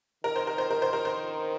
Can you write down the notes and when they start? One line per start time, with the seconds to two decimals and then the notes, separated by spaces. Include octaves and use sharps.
0.24 D#3 A#4
0.36 C5
0.47 A#4
0.58 C5
0.70 A#4
0.82 C5
0.93 A#4
1.05 C5